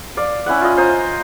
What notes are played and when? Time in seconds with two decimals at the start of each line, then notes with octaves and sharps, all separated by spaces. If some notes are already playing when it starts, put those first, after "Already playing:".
0.17 D5 F5
0.46 C#4 E4 E5 F#5
0.61 F4 D#5
0.77 C5 D#5 A#5